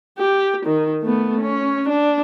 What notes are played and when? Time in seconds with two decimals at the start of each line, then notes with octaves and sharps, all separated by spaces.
0.18 G4
0.66 D#3
1.02 A3 B3
1.41 C#4
1.89 D4